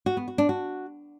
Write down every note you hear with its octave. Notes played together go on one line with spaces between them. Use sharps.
F#4
B3
F#4
D4
F#4